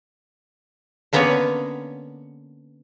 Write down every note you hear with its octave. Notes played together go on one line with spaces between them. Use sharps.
D3 A#3 B3 C#4 B4 C#5